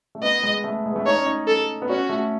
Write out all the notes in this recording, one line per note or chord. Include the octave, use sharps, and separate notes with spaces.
A3
B3 D#5
G#3
A3
G#3
B3
A3
D#4 C#5
C#4
D#4
A4
B3
C#4 F#4
A3